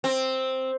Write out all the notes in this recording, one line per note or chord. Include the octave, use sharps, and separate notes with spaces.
C4